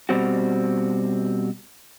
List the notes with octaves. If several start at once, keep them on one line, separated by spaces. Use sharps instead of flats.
B2 G3 C4 F#4